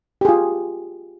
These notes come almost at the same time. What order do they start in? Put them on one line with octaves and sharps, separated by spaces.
G4 G#4 F4